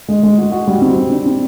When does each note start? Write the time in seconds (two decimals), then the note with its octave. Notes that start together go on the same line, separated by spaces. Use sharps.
0.08 G#3
0.23 G#3
0.38 F#4
0.52 F#4
0.67 G3
0.82 C4
0.96 G3
1.11 D4
1.25 C4